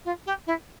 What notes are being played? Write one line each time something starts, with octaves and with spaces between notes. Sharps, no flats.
F4
G4
E4